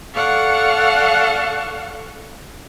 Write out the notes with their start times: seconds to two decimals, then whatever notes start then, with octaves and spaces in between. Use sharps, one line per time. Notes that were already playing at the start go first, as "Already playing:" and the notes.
0.14 A4 D5 F5 F#5 C#6 F6